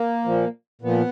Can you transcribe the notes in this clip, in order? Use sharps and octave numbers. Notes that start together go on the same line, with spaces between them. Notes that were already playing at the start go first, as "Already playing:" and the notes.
Already playing: A#3
A#2 F3
A#2 F3 B3